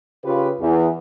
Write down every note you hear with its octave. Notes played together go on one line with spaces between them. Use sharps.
C#3 F4 G4 B4
E2